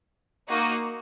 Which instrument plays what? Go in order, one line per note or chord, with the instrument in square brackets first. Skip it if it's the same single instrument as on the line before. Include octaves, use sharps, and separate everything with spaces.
[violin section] A#3 D#4 F#4